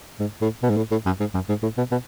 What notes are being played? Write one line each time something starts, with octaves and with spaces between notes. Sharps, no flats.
G#2
A2
B2
G#2
A2
A2
F#2
G#2
F#2
G#2
A2
B2
B2